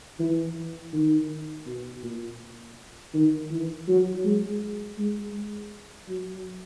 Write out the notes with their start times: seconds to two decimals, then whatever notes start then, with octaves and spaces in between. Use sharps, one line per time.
0.19 E3
0.93 D#3
1.67 B2
2.03 A#2
3.14 D#3
3.51 E3
3.88 F#3
4.24 G#3
4.98 G#3
6.08 F#3